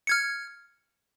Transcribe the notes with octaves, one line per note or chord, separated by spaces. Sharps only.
F6 G#6 C#7